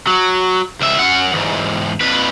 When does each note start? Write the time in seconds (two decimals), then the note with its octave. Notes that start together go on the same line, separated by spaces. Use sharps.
0.07 F#3
0.81 C#2 E5
0.99 F#2 F#5
1.33 E2 G#2
2.01 F2 B4